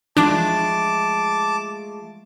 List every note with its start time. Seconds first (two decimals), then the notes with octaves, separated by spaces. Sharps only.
0.17 F3 G#3 A3 D4 A5 D6